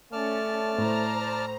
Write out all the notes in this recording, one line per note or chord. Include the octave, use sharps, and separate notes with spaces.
A3 C#4 D5 A5 F6
A2 C5 A#5